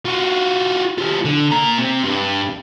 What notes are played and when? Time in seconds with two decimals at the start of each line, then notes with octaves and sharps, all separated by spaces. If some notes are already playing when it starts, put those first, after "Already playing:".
0.05 F4 F#4
0.98 G3 F4
1.25 D3
1.51 A#2 A#5
1.78 C3
2.04 G2